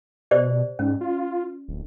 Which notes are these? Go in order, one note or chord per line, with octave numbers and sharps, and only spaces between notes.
B2 G4 C5 D5
G#2 C#4
F4
D1